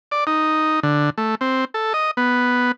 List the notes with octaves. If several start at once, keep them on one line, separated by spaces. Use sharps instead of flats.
D5
D#4
D3
A3
C4
A4
D#5
B3